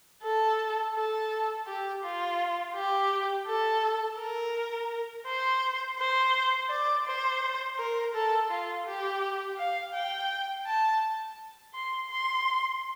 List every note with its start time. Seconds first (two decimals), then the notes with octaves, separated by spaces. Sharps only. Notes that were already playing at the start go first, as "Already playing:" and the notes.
0.23 A4
0.95 A4
1.66 G4
2.03 F4
2.75 G4
3.47 A4
4.19 A#4
5.26 C5
5.98 C5
6.70 D5
7.06 C5
7.78 A#4
8.14 A4
8.50 F4
8.86 G4
9.58 F5
9.94 G5
10.66 A5
11.74 C6
12.10 C6